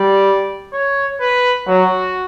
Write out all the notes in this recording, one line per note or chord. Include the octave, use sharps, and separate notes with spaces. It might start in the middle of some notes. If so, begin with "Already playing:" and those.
Already playing: G3 D5
C#5
B4
F#3 F#4